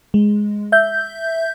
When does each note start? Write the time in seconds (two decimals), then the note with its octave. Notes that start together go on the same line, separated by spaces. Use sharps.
0.14 G#3
0.72 E5 G6